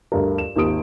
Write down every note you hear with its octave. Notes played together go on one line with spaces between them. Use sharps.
D2 G2 A#4
E7
G#1 D#2 G4 D#6 D7